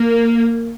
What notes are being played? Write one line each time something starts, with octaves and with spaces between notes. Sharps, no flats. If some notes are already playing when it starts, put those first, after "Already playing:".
Already playing: A#3